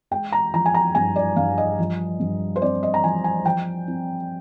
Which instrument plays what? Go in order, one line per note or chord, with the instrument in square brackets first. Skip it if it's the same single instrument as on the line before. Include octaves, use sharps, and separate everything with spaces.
[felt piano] G#3 G5
A#5
F3 A#5
G#5
A#5
G2 G#5
D5
G2 F5
D#5
F3
G2
C5
C4 D5
D#5
A#5
F3 G#5
G#5
F3 G5
C4